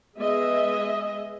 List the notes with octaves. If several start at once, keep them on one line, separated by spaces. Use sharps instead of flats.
G#3 B3 G#4 D#5 E5